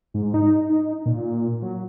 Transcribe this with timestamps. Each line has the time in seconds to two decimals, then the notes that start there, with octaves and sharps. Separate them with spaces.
0.14 G#2
0.34 D#4
0.70 D#4
1.06 A#2
1.62 F#3